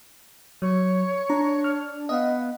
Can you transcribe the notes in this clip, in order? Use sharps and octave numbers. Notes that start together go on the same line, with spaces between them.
F#3 C#5
D4 A#5
F6
B3 D#5 F5